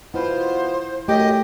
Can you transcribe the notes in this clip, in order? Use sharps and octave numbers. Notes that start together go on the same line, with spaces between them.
B2 B3 E4 F4 C5
F#2 A3 G4 D#5